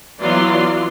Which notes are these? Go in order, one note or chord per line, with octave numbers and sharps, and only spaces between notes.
E3 F#3 B3 F4 D5 C6